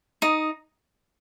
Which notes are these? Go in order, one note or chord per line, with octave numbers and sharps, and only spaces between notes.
D#4 D#5